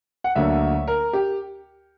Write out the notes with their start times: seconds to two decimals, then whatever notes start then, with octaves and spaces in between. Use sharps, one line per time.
0.24 F#5
0.35 D2 D3 F#3 A#3 E5
0.88 A#4
1.13 G4